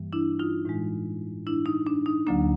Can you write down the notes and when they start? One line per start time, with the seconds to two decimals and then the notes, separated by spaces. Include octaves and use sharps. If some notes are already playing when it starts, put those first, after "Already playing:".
Already playing: G2 E3 G3 A#3
0.13 D4 E4
0.39 D#4 F4
0.65 A2 E3 G#3
1.47 D4 E4
1.66 D#4
1.87 D4
2.06 D#4
2.27 D2 D3 F#3 A#3 D4